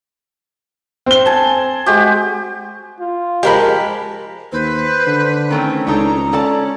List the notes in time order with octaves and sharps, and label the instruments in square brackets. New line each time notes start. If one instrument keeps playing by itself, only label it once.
[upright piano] C4 G7
[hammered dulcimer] G#5 A5
G#3 F#4 G4
[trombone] F4
[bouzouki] F3 F#3 G#3 [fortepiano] G4 A#4 B5
[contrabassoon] D#2 [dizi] B4 [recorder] C5
[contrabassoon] D3
[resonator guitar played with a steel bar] D#3 A3 C4 [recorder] C#4
[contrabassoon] C#2 [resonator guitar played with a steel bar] D4 D#4 A4 [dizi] A#5
[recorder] C#4 [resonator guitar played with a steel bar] A4 D5 A5